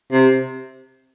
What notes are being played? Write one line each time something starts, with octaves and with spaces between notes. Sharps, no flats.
C3